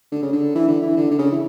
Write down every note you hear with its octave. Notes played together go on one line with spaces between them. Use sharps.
D3
C#3
D3
E3
D3
E3
D3
D3
C#3
E3